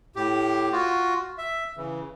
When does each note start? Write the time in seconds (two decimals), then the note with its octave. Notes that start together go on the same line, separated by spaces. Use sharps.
0.16 A2 G4
0.72 F4 F#4
1.38 E5
1.77 C#3 E3